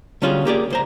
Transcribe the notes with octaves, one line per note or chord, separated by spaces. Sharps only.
D3 G3 C#4 F4 F#4 G#4
A#3 G4 G#4 D5
C#2 C5 A#5